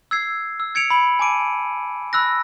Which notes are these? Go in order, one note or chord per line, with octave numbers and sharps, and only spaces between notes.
E6 G#6 C7
E6
G#6 C#7 D7 F7
B5 F#7
G#5 A5 D6 D7 D#7
B5 E6 F#6 A#6